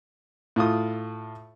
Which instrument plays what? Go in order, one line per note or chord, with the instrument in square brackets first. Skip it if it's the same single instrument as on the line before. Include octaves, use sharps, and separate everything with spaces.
[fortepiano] A2 F4 D#6